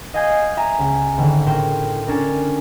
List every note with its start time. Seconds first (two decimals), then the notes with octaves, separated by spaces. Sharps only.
0.14 D#5 F5 G#5 G6 G#6 C7
0.57 E5 G#5 A#5
0.79 C#2
1.18 G#1 D3
1.46 A2 A#4 C5 G5
2.07 C#4 D4 A#4